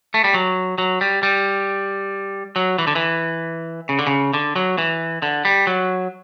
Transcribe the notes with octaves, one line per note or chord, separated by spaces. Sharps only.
A3
G3
F#3
F#3
G3
G3
F#3
E3
D3
E3
C#3
D3
C#3
D3
F#3
E3
D3
G3
F#3